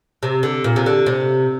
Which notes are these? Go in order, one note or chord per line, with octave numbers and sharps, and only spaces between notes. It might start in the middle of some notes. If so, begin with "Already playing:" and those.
C3
D3
A#2
C3
D3
C3